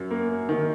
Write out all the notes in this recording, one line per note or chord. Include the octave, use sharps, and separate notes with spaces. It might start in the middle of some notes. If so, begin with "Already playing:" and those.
Already playing: F#2
A#3
D#3